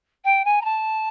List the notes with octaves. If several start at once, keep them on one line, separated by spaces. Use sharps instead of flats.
G5
G#5
A#5
A5